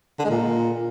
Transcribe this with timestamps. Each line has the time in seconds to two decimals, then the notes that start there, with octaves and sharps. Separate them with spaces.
0.19 D3
0.25 G#3
0.30 A#2